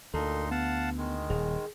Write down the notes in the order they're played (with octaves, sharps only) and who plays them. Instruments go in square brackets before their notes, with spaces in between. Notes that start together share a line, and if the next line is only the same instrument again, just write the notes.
[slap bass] D2 [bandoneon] A#2 D#4 C6 [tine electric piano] A4 A5
[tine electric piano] B3 [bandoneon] F5 F#5 A5
[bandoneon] D#3 G#3
[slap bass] D#1 [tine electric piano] G#4